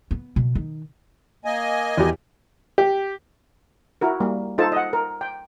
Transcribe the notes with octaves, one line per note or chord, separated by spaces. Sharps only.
B3
B2
D#3
A#3 D#5 G#5
E2 G4
G4
E4 F#4 A#4
G3 A#3
D#4 F4 A4 C5 A5
D#5 F#5
A#4
G5